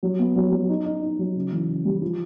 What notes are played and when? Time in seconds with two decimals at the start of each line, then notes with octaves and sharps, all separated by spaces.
0.03 F#3
0.19 B3
0.36 F#3
0.52 F#3
0.69 D#4
0.86 D#4
1.02 D#4
1.19 F#3
1.35 C#3
1.52 E3
1.69 C#3
1.85 G3
2.02 F3